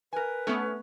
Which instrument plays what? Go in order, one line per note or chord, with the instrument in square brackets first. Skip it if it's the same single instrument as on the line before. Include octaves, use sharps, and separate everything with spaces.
[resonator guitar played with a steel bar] A#4 G#5 [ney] B4
[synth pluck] A3 B3 [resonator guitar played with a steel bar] C#4